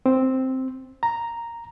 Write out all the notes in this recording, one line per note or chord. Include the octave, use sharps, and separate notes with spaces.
C4
A#5